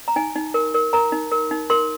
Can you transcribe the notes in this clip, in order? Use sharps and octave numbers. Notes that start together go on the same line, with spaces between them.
A#5
D#4 G#5
D#4
A#4
A#4
A#4 A#5
D#4
A#4
D#4
A#4 C6